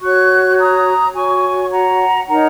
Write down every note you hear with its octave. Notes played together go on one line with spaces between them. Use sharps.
F#4 C#5 C#6 F#6
A#5 D#6
F#4 C#5 G#5 C#6
F#5 A#5
D#4 A#4 C#5 F#5 A#5